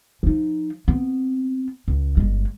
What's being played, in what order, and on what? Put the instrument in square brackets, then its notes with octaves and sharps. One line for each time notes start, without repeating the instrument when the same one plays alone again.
[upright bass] F3 D#4
B3 C4
C#2
G1 G#3